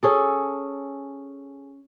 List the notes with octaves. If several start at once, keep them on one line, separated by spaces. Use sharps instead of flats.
C#4 G#4 A4